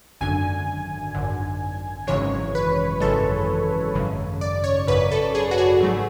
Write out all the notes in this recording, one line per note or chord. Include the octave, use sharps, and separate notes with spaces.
G#1 F#2 D3 G#5
G#1 F#2 D3
G#1 F#2 C#3 E3 G#3 C#5
B4
G#1 F#2 C#3 E3 G#3 A4
G#1 F#2 C#3
D5
C#5
G#1 F#2 C#3 B4
A4
G#4
F#4
G#4
G#2 F#3 A3